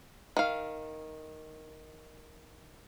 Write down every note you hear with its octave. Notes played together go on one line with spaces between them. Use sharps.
D#3 F5